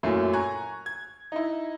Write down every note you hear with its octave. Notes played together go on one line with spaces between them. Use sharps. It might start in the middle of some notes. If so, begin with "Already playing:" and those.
F#2 A#2 A3 A#3 E4
G#5 A#5 C#6 F#6 G#6
G#6
D#4 E4